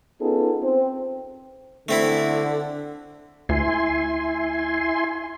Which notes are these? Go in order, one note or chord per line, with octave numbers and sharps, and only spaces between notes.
B3 C#4 D#4 F4 G#4 A4
C4
D3 A3 C4 E4
D2 E4 G#5 C6